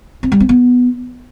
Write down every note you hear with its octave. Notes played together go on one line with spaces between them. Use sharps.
C4
G3
C4
B3